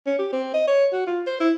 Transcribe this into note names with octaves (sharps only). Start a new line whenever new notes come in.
C#4
G4
C4
D#5
C#5
F#4
F4
C5
E4